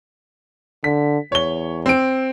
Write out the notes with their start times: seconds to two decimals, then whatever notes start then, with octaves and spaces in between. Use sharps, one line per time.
0.84 D3 B6
1.32 E2 C#5 G7
1.86 C4 D7